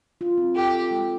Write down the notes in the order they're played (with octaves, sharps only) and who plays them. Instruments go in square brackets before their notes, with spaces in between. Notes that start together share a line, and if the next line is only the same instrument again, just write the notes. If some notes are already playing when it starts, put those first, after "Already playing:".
[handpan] F4
C4
[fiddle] G4 [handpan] A4
[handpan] A4
G#3